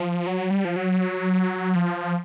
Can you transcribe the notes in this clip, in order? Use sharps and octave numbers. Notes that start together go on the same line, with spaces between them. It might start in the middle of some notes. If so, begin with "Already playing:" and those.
Already playing: F3
F#3
G3
F3
F#3
F3